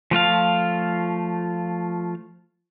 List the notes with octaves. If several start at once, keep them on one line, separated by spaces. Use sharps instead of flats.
F3 A3 F4 F5